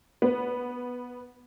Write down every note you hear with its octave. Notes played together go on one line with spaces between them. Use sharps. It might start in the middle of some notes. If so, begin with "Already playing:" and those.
B3